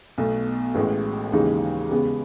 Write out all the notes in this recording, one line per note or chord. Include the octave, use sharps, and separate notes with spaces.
B1 B2 A3
A1 A2 G#3
D#2 C#3 E3 G#3 D#4
E2 C#3 G#3 B3